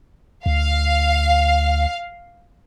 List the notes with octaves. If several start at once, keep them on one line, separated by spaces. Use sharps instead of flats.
D2 F5